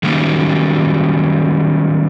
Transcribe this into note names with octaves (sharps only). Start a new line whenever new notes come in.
D#3 F#3 G3 A#3 C#4